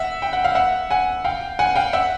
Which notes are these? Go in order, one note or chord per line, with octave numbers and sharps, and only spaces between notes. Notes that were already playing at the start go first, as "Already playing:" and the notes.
Already playing: E5 F#5
G5
F#5
F5
E5 F#5
F#5 G#5
F5 G5
F#5 G#5
F5 G5
E5 F#5